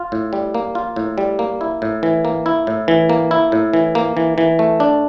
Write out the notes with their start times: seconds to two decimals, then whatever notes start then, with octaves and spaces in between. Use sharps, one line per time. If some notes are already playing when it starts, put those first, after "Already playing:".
Already playing: F4
0.12 A2
0.33 G3
0.55 A#3
0.75 F4
0.96 A2
1.18 G3
1.39 A#3
1.61 E4
1.82 A2
2.03 E3
2.25 A#3
2.46 E4
2.67 A2
2.88 E3
3.10 A#3
3.31 E4
3.52 A2
3.74 E3
3.95 A#3
4.17 E3
4.38 E3
4.59 A3
4.80 D4